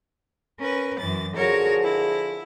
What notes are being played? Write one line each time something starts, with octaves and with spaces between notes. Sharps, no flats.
C#4 A#4 B4
F#2 E3 A6
D3 F3 F#4 G#4 A#4 C#5
E4